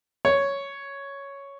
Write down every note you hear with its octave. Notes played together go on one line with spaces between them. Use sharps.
C#5